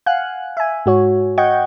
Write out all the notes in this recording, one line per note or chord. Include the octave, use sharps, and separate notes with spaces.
F5 F#5 G#5 F#6
E5 G#5
G#2 F#4 C#5
D#5 F#5 G5 C#6 G6 G#6